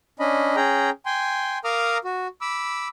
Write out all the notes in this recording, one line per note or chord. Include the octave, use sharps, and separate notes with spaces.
C#4 D4 D#5 B5
C#4 G#4 G5 A#5
G5 G#5 C6
A#4 F5 A#5 D6 D#6 F6
F#4
B5 D6 E6